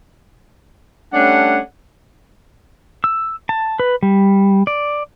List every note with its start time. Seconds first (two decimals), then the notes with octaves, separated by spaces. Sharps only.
1.13 G3 A3 C#4 D4 F#5
3.04 E6
3.49 A5
3.80 B4
4.03 G3
4.67 D5